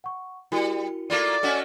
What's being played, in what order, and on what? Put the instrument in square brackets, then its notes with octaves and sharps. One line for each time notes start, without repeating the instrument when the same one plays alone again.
[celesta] F#5 C#6
[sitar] G3 [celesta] E4 F#4 A#4
[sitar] A3 A#3 F4 [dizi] D5
[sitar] A3 C#4 F#4 [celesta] D#5 F#5 G#5